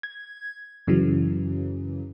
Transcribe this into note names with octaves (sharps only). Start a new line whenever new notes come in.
G#6
F#2 C#3 E3 F#3